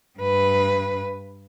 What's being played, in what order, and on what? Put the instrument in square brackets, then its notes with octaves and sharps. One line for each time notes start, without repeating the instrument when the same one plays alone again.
[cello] G2 B4